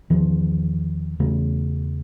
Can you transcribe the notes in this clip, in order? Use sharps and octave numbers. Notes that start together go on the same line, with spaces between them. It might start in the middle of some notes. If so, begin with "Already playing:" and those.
E2 D#3 F3
E2 C#3 A3